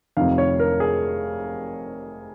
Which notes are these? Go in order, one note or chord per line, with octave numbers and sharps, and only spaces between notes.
F1 F2 C3 D#3 F5
C#5
A#4
G#4